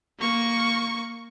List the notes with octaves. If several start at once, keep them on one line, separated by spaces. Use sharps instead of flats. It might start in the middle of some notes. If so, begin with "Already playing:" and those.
A#3 C#6